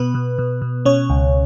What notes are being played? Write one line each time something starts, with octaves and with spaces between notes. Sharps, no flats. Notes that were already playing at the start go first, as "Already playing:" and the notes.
Already playing: B2 B3 B4
B2
B2
B2
B2 C#4 C#5
C#2